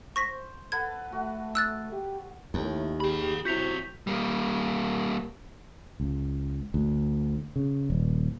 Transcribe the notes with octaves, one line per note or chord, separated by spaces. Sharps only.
C5 C#6 A#6 B6
A4 B4 F#5 G#6
A3 F#4
E6 F#6 A6
G4
D#2 A2
G4 G#4 B5
C3 F3 E4 F#4 G6 B6 F7
G3 A#3
C#2
D2
C#3
D#1